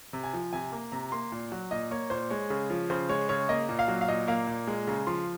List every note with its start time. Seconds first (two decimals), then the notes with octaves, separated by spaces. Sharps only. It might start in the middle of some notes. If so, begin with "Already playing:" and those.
0.13 C3
0.24 G#5
0.33 F3
0.53 C3 G#5
0.72 A#3
0.92 C3 A#5
1.12 A#3 C6
1.32 A#2
1.52 F#3
1.71 A#2 D#5
1.91 A#3 C#5
2.10 A#2 C5
2.30 G#3 C#5
2.50 C#3
2.70 F3
2.90 C#3 C5
3.09 G#3 C#5
3.29 C#3 C#5
3.49 A#3 D#5
3.69 A#2
3.79 F5
3.88 F#3
4.01 F5
4.08 A#2 D#5
4.27 A#3 F5
4.47 A#2
4.67 G#3
4.87 C#3 A#5
5.07 F3 C6